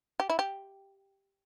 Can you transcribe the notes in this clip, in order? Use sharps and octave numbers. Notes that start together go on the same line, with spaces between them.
G4
E4
G4